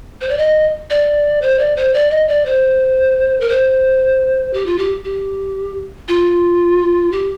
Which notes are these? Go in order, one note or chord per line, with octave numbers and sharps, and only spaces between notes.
C5
D5
D#5
D5
C5
D5
C5
D5
D#5
D5
C5
A#4
C5
G4
F4
G4
G4
F4
G4